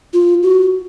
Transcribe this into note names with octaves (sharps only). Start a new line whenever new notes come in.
F4
F#4